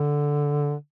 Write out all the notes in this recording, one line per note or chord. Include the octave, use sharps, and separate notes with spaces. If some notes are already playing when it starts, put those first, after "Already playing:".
Already playing: D3